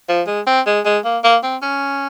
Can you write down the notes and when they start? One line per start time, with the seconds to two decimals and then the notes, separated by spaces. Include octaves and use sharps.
0.09 F3
0.27 G#3
0.47 C4
0.67 G#3
0.85 G#3
1.05 A#3
1.24 A#3
1.43 C4
1.62 C#4